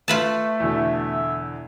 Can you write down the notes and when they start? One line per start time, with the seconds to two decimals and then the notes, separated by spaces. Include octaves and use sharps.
0.08 A3 F4 B4 A5
0.60 E2 B2 D3 E5